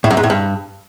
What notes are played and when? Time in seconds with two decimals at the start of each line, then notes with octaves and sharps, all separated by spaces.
0.04 A2
0.10 F#2
0.17 G#2
0.23 A2
0.30 G2